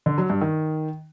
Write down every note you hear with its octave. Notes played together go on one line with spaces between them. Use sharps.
D3
F#3
G2
D#3